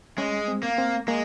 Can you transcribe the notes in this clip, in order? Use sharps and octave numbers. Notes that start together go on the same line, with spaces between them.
G#3 C#4
C4
A#3
C4
G#3 A#3